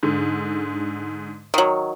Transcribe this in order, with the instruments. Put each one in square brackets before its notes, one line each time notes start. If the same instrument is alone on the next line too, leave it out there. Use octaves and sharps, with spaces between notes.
[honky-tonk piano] G#2 D3
[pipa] D#3 F#3